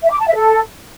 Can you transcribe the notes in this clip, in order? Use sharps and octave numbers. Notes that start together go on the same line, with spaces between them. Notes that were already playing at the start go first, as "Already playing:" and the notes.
E5
D6
A5
E5
A4